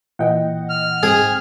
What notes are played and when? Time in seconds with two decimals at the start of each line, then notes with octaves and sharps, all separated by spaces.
0.19 A#2 E3 D#5 F#5 G5
0.70 F6
1.03 G#2 C4 G#4 G5